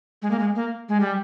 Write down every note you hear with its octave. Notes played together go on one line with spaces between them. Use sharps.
G#3
A#3
G#3
A#3
G#3
G3